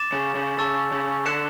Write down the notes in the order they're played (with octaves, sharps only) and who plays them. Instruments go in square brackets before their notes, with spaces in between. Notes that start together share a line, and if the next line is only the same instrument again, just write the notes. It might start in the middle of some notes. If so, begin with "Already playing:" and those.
Already playing: [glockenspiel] D6 A6 E7
[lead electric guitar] C#3
C#3
[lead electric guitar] C#3 [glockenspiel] A5 C#6 E6 A6
[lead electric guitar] C#3
[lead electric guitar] D3 [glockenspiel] F#6 C#7 E7